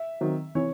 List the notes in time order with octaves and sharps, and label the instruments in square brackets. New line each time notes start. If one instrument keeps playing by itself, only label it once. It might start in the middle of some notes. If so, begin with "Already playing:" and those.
Already playing: [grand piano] E5
[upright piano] D#3 F#3 C4
[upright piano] C3 E3 [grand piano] C#5